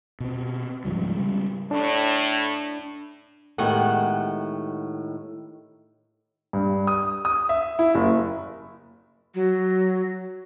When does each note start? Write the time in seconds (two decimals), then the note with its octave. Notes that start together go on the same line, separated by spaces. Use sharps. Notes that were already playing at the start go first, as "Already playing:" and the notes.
0.20 B2 C4
0.85 G#2 C#3 F3 G3
1.18 C#3 G3
1.71 A2 D4
3.58 A2 D#3 G#3 B3 G4 F#5
6.53 G2
6.87 D#6
7.25 D#6
7.49 E5
7.79 E4
7.95 F#1
9.35 F#3